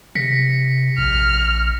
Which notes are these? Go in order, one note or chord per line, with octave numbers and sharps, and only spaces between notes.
C3 A#6 B6 C#7
A#1 F6